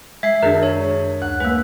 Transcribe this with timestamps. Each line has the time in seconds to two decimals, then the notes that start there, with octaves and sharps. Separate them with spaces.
0.23 G#3 E5 G#6 C7
0.42 F#2 D#3 D4 G#4 A#4
0.63 C#5
1.22 D2 F#6
1.40 G#3 A#3 B4